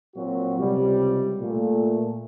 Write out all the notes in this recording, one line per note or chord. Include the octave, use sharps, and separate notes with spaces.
A#2 F#3 C4 F#4
C#2 C3 G3
A#2 A3